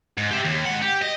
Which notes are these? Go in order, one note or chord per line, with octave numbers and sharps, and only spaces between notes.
G#2
G4 E5
D#2
G#2 F#5
G4
D#5